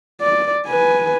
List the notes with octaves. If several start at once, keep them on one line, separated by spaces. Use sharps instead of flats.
D5
B4 G#5